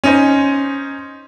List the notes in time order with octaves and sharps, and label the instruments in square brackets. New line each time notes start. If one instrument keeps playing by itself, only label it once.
[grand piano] C#4 D#4 C5